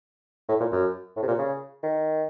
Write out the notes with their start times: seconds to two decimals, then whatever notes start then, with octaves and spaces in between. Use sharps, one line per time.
0.48 A2
0.60 A#2
0.72 F#2
1.16 A2
1.23 C3
1.28 A#2
1.39 C#3
1.83 D#3